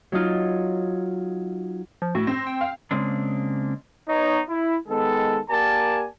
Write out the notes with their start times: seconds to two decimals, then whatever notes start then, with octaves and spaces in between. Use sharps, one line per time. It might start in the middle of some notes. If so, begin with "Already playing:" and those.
0.12 F#3 D#4 F4
2.02 F3
2.15 A2 F#4
2.27 C4 A#6
2.47 G5
2.61 F5
2.91 C#3 G#3 A#3 C4 D4
4.09 B3 D#4 C#5
4.49 E4
4.88 D#3 G#3 B3 A4
5.50 A#3 G4 A#4 D5 G#5 A5